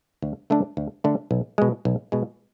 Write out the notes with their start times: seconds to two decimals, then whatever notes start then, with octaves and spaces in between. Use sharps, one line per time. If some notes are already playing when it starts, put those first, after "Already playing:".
0.22 D2
0.50 D3 A3 D4
0.77 D2
1.04 D3 A3 D4
1.31 B1
1.58 B2 G#3
1.85 B1
2.12 B2 G#3